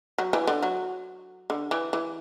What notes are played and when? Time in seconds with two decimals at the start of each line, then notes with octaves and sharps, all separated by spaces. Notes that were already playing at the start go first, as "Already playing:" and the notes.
0.18 F#3
0.33 E3
0.47 D3
0.63 F#3
1.50 D3
1.71 E3
1.93 E3